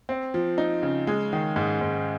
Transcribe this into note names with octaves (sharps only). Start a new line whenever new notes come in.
C4
F3
D#4
C#3
G#3
D#3
G#2
G#2